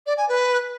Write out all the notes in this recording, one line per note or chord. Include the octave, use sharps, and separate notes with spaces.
D5
G#5
B4